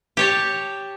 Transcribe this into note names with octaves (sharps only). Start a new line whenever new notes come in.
G4 C#5 A5